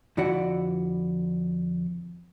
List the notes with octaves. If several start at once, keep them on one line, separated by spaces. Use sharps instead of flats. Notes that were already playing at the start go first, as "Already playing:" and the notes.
F2 D3 E4 F#4 D5 F#5